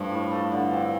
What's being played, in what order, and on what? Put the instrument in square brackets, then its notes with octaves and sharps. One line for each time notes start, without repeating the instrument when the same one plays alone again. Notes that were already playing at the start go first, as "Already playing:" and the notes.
Already playing: [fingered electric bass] G2 [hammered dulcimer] F3 A3
[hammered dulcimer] A2
F3 A3
D3
F3 C4